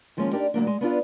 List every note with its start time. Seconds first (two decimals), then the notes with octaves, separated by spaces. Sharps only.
0.17 D#3 F3 G#3 A#3 C#4
0.32 D4 D#4 G4 A#4 D5
0.54 D2 F#3 A#3 D4
0.67 G#3
0.81 B3 D4 F4 B4